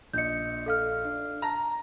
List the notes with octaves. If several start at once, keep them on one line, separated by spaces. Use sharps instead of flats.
A#1 D#5 G6 C#7
A4 F5 F6
D4
A5 A#5 A#6